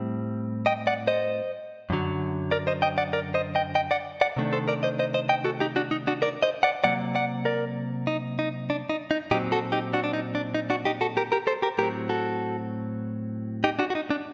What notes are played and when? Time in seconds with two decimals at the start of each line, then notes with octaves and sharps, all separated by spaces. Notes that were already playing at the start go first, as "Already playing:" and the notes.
Already playing: A2 G3 C4
0.66 D#5 G5
0.87 D5 F#5
1.07 C5 D#5
1.90 F#2 D3 F#3
2.51 A#4 D5
2.67 C5 D#5
2.82 D#5 G5
2.98 D5 F#5
3.13 A#4 D5
3.34 C5 D#5
3.55 D#5 G5
3.75 D#5 G5
3.91 D5 F#5
4.21 D5 F#5
4.36 C3 D#3 A3 D4
4.53 A4 C5
4.68 A#4 D5
4.83 C5 D#5
4.99 C5 D#5
5.14 C5 D#5
5.29 D#5 G5
5.44 F#4 A4
5.60 D#4 G4
5.76 D4 F#4
5.91 D#4
6.07 D4 F#4
6.22 A#4 D5
6.43 C5 D#5
6.63 D5 F#5
6.84 C3 F#3 A#3 D5 F#5
7.15 D5 F#5
7.45 A#4 D5
8.07 D#4
8.39 D#4
8.70 D4
8.89 D#4
9.11 D#4
9.31 A#2 F#3 C4 D#4 G4
9.52 F#4 A4
9.72 D#4 G4
9.93 D4 F#4
10.04 D4
10.13 D#4
10.35 D4
10.54 D#4
10.70 D4 F#4
10.85 D#4 G4
11.01 F#4 A4
11.17 G4 A#4
11.32 G4 A#4
11.47 A4 C5
11.62 G4 A#4
11.78 A2 F#3 C4 G4 A#4
12.09 F#4 A4
13.64 D#4 G4
13.79 D4 F#4
13.90 F#4
13.95 D#4
14.10 D4